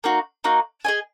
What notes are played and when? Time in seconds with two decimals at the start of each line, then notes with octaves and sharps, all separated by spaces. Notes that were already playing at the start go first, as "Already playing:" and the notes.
0.04 A#3 D#4 F#4
0.44 A#3 D#4 F#4
0.85 G#4 D#5 G#5